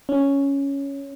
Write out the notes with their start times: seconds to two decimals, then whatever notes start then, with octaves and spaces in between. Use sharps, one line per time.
0.09 C#4